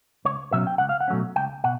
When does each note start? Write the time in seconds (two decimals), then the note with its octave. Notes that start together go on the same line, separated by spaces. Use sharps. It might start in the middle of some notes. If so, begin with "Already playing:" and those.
0.25 C#2 C#5
0.52 B2 F#3 A3 C#4 E5
0.67 G5
0.78 C#2 F#5
0.89 F5
1.00 F#5
1.08 B2 F#3 A3 C#4
1.36 C#2 G5
1.64 B2 F#5